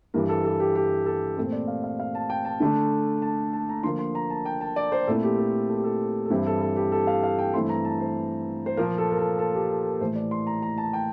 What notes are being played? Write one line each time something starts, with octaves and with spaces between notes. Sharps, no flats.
G2 E3 G3 A#4
A4
A4
G4
G4
A4
A#2 A3 C4 C5
D5
F5
F5
F5
A5
G5
A5
D3 A3 D4
A5
A5
A#5
D3 F3 A#3 C6
C6
A#5
A5
G5
A5
D5
C5
A#2 A3 C4 E4 A4
G4
A4
A4
G4
A4
A4
G2 E3 G3 C4 E4 G4
A4
A4
G4
A4
F5
F5
G5
G2 E3 A3 C4 E4 C6
A#5
A5
C5
C5
A#2 F3 A#3 A#4
A4
A#4
A4
A4
G4
A4
A#4
A2 E3 A3 C5
D5
C6
A#5
A#5
A5
G5